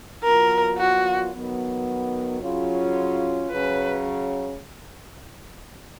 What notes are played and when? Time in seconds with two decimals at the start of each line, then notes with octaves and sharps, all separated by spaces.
0.23 A#2 F#3 B3 F4 A#4
0.78 F#4
1.33 D#3 F#3 B3
2.42 C#3 F#3 C#4 F4
3.51 C#3 F#3 C#4 B4